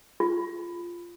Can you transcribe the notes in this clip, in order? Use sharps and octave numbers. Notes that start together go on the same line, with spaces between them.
F4